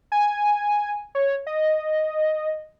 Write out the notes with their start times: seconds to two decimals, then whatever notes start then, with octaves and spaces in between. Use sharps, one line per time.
0.12 G#5
1.15 C#5
1.47 D#5